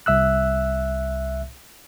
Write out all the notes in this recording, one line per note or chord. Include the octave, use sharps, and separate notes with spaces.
C2 E5 E6 F#6